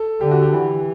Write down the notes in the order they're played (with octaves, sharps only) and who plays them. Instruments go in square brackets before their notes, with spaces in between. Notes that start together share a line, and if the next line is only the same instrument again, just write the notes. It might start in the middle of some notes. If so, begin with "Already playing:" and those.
Already playing: [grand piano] A4
[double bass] D3 [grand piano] G4
[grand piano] F#4
G4
[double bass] E3